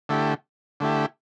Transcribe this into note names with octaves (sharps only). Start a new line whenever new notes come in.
D3 A3 E4 G4
D3 A3 E4 G4